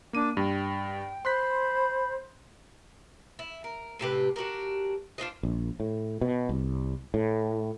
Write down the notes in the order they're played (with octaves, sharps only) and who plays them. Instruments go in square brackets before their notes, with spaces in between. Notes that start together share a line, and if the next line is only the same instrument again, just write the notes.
[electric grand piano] A#3 D#7 [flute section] D4 D6
[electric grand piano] G2 [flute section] G5
[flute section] C5 B5 [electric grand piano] C6 F#6 B6
[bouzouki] E4
A#4
A2 C3 G4 B4
D4 F#4 G4 A#4
D4 F4 C5 D#5
[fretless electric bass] A#1
A2
B2
C2
A2